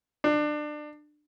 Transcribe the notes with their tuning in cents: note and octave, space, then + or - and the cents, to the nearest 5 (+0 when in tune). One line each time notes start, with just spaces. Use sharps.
D4 +25